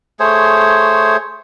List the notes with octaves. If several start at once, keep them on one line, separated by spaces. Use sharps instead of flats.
A3 G#4 C5 C#5